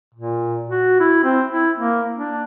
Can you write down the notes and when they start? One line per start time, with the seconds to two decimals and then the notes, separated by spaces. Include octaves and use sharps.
0.14 A#2
0.69 F#4
1.00 E4
1.24 C4
1.51 E4
1.78 A#3
2.17 D4